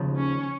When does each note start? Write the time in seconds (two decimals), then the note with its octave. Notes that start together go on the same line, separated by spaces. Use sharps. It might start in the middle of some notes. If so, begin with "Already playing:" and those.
Already playing: D#2 C#3 F3
0.16 C#4